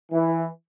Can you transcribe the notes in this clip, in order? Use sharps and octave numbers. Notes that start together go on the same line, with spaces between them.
E3